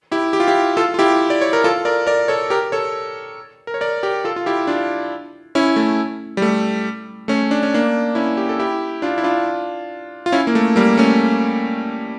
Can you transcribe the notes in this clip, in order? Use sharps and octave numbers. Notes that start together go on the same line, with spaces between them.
E4 G4
G4
F4
E4 G4
F4 A4
F4
E4 G4
D5
C#5
A#4
F4 A4
A#4 D5
A#4 D5
A4 C#5
G4 A#4
A4 C#5
A#4
C#5
A#4 D5
G4 A#4
F4 A4
F4
E4 G4
D4 F4
C#4 E4
A3
G3
A3
A3 C#4
D4
C#4
A#3 D4
C#4 E4
G4
A4
E4 G4
D4 F4
E4
D4 F4
F4
C#4 E4
A#3
A3
G3 A#3
A3 C#4